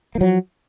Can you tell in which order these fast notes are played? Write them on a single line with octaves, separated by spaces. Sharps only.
A#3 F3 F#3